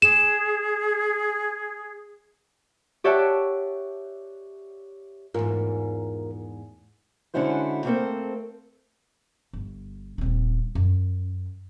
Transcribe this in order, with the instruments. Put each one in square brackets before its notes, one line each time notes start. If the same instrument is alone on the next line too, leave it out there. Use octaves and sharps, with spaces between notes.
[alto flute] G#4 [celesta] E7
[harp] G4 C#5 D5 E5 F#5 A5
[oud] E2 G#2 [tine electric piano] F4 A#4
[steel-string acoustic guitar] D3 G#3 C#4 E4 F#4 C5
A3 A#3 C4 A4 A#4 C5
[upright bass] G1
D#1 C4
F#2